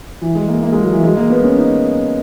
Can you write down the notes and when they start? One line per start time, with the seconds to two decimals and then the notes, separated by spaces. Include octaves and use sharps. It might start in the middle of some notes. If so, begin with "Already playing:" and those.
0.22 E3
0.35 G#3
0.48 A#3
0.63 A#3
0.73 G#3
0.83 F#3
0.93 E3
1.04 G#3
1.17 A#3
1.30 B3
1.44 C#4
1.58 D#4